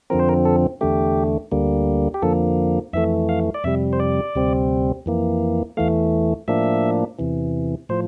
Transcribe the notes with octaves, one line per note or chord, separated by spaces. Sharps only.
F2 D3 F3 C4 A#4
C5
A#4
A4
E2 D3 A3 G4
D2 D3 G3 A#3
G4
F2 D3 F3 A#3 A4
F2 E3 A3 E5
F5
D5
F2 C3 G3 E5
C5
D5
D2 C3 G3 C4
F2 E3 A#3
E2 E3 A3 F5
A2 F3 A#3 D4 E5
E2 C3 E3
A2 F3 C5